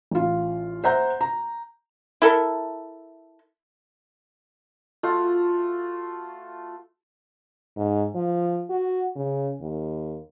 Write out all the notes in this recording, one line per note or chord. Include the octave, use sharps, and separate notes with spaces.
A1 F4
C5 E5 F#5 A#5 G6
A#5
E4 A4 A#4
A3 F4 F#4
G#2
F3
F#4
C#3
D#2